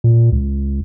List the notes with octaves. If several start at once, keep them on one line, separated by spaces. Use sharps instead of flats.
A#2
C#2